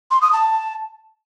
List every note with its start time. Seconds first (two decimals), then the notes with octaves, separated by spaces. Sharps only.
0.11 C6
0.22 D#6
0.33 A5